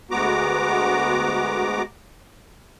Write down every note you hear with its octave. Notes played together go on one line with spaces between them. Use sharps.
D2 G#3 B3 F#4 A#5 D6